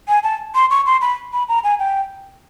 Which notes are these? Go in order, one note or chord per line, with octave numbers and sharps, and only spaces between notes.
G#5
A5
C6
C#6
C6
B5
B5
A#5
G#5
G5